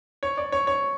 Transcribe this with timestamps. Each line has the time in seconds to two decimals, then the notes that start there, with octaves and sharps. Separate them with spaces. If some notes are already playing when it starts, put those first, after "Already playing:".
0.23 C#5
0.37 D5
0.52 C#5
0.67 C#5